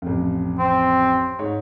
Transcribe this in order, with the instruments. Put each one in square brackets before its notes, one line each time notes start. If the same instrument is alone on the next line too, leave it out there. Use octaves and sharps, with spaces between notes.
[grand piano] A1 F2
[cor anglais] C4
[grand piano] G#2 C#5